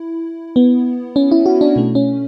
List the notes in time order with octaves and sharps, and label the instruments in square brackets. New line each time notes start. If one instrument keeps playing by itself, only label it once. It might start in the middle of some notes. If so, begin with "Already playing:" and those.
Already playing: [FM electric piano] E4
B3
C#4
E4
F#4
D4
B2 A3
C#4